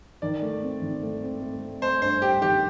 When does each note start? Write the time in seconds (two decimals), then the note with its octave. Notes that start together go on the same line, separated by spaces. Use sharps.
0.22 D#3 D5
0.42 A3
0.62 C4
0.82 D#3
1.02 A3
1.23 C4
1.42 A3
1.62 A3
1.81 A3 C5
2.02 G2 C5
2.22 G2 G4
2.42 D#3 G4